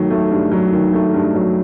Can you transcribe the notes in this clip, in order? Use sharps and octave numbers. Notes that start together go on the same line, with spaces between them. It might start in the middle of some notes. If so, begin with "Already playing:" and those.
Already playing: D#3 F#3 A3
A3
G2
F#3
D#3
A3
G2
F#3